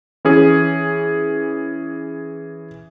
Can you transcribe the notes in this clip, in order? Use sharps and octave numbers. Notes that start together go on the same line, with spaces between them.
E3 C#4 G#4